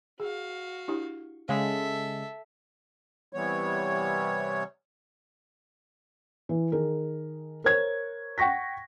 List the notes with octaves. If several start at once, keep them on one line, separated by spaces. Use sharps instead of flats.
F#4 G#4 F5
D4 E4 G4
C#3 G#3 A4 E5 F5
C3 E3 G3 B3 C#5
E3
D#3 G#4 A#4
A#4 C5 C#5 G#6
F#5 G5 C#6 A#6 B6